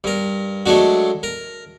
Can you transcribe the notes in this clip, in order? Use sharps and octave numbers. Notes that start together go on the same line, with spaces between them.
G2 A#4
F#3 G#3 A3 D4 F#4
A#4